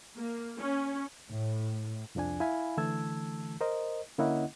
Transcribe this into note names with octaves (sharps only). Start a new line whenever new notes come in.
A#3
C#4
A2
C2 F2 F3 D4 G#5
E4 E5 F5 G#5 B5
D3 E3 A3 A5 E6 G#6
A#4 C5 D#5
D3 A#3 C#4 E4 D#5 F#5